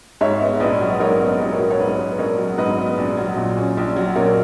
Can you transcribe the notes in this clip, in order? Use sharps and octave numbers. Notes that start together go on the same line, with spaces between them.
G#2 C#5 E5
B3
A#1 B4 D#5
F#3
G#2 A#4 C#5
B3
B4 D#5
A#1
A#4 C#5
F#3
C#5
G#2 B4
B3
A#1 A#4 C#5
F#3
G#2 B4 D#5
B3
A#1
F#3
A#2
C#4
A#1
F#3
A#2 A#4 C#5